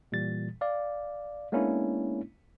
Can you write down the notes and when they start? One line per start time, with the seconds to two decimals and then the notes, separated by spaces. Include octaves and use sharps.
0.12 A#2 E3 G3 A6
0.61 D5 F5
1.52 G#3 A#3 B3 C#4 D4 E4